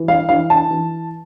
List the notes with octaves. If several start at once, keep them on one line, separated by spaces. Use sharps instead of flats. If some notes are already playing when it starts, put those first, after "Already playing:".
Already playing: E3
F5
E3 F5
A5
E3